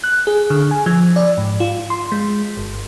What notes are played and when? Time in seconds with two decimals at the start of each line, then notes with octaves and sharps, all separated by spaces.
0.04 F#6
0.27 G#4
0.50 D3
0.71 G#5
0.86 F3
1.16 D5
1.37 G#2
1.60 F4
1.90 C6
2.12 G#3
2.57 G1